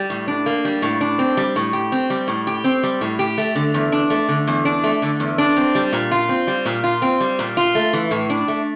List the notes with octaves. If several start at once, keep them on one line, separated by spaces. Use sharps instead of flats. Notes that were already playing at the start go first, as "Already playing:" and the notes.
Already playing: G3
A2
D4
A#3
G3
A2
D4
C4
G3
A2
G4
C4
G3
A2
G4
C4
G3
A2
G4
A3
D3
E2
D4
A3
D3
E2
D4
A3
D3
E2
D4
C4
G3
A#2
F4
C4
G3
A#2
F4
C4
G3
A#2
F4
A3
E3
A2
D4
A3